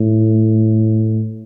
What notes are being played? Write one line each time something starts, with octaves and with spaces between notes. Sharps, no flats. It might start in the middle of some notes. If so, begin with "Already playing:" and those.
Already playing: A2